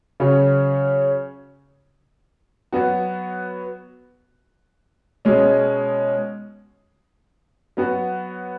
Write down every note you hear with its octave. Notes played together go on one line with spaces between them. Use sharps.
C#3 F#3 C#4
F#3 B3 F#4
B2 G#3 C#4
F#3 B3 F#4